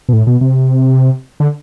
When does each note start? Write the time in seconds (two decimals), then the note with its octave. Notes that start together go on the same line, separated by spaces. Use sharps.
0.09 B2
0.13 A2
0.27 B2
0.41 C3
1.40 D3